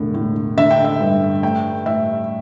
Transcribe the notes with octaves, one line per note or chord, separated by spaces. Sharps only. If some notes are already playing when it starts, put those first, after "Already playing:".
Already playing: E1 A2 D3
A2
D3 E5
G5
E5
G2
A3 G5
A2 E5